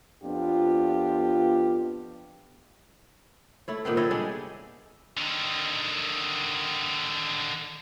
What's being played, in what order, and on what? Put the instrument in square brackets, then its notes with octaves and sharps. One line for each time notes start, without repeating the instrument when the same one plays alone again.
[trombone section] F2 B3 D4 F4 G4
[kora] A3 E4 C#5
A#2 D#3 B3 C4
E4 A4 C#5 D#5
G3 G#3 D4 G#4
[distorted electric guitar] D3 D#3